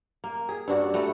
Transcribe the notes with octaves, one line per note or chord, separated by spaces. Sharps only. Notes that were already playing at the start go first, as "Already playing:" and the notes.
A#3
G#4
G2 D4 F#4
A3 F#4 B4